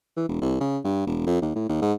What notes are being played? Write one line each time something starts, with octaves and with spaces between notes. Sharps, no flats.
E3
E1
C2
C#3
G2
E1
F2
D#2
A2
D#2
G#2